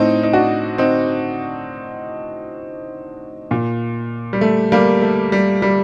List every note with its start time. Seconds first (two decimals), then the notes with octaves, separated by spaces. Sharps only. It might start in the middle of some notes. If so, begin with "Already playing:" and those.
Already playing: A2 C4 D#4
0.23 D#4
0.33 D4 F#4
0.78 C4 D#4
3.51 A#2
4.33 G3
4.41 A3
4.72 G3 A#3
5.02 A3
5.32 G3
5.62 G3